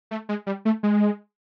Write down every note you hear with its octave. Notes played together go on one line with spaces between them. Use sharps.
A3
G#3
G3
A3
G#3